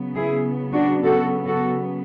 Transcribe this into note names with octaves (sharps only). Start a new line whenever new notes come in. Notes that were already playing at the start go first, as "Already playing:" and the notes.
Already playing: C#3 F#3 B3
E4 G#4
D4 F#4
F#4 A4
F#4 A4